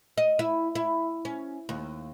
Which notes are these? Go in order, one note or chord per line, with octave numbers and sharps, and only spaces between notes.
D#5
E4
E4
C#4
D#2